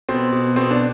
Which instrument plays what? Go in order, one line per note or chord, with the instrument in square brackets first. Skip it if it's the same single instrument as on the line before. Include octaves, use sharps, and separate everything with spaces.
[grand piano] B2 C4
B2
B2 C4
D4